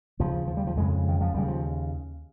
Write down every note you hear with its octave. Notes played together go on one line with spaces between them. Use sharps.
D#2 C#3 F3
F3
G3
F3
F2 C#3 G#3
D#3
F3
D#2 C#3 G3
F3